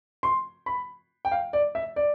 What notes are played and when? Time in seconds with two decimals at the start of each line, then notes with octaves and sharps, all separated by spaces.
0.23 C6
0.66 B5
1.25 G5
1.32 F5
1.53 D5
1.75 E5
1.96 D5